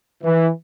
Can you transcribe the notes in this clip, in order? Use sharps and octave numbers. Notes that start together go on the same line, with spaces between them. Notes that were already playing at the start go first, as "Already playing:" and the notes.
E3